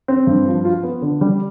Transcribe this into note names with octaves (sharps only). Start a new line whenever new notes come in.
C4
G2
F3
F4
B3
D3
G3